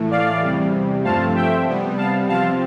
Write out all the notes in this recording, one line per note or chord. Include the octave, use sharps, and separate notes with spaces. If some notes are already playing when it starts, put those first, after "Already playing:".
Already playing: A2 E3 A3
D5 F5
E2 C3 G3
G2 F3 A3 C4 F5 A5
E5 G5
C3 G3 B3
F5 A5
C3 F3 C4 F5 A5